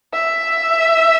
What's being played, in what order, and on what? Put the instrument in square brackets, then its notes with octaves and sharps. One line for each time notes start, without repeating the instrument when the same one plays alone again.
[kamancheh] E5